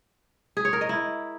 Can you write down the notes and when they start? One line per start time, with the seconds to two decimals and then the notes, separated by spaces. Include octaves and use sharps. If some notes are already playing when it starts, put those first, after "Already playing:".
0.57 G#4
0.65 C#5
0.73 A#4
0.81 D#5
0.89 E4